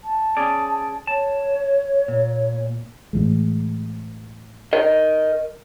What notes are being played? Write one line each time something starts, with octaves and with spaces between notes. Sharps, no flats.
A5
C#4 G#4 D5
C#5 A5
A#2
A2 E3 G#3
A#4 D#5